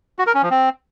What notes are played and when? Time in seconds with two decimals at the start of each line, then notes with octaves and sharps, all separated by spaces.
0.19 F#4
0.27 A#4
0.35 C#4
0.42 F3
0.50 C4